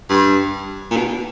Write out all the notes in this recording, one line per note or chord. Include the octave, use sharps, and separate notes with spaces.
G2
A#2
B2